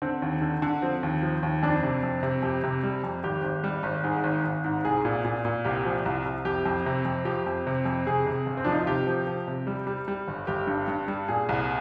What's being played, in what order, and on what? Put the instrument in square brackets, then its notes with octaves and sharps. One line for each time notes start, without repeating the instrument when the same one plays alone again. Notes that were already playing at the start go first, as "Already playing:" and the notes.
[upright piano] D3 C4
D#2
D3
D3
F3 C4
D#2
F3
D#2
F2 D4
C3
F2
C3
F2 G4
C3
G3
F2
G#1 G4
G#1
G3
G#1
G#2 G#4
G#1
G#1
G#2
C2 G#4
A#2
A#2
A#2
C2 G4
F3
C2
C2
F2 G4
F2
C3
F2
F3 G4
F2
C3
F2
C3 G#4
C3
G1
C4
F3 D4
D#4
F4
C3 G4
F3
F3
C3
G3
G3
G3
G1
G1 G4
G2
G2
G3
A#2 G#4
C2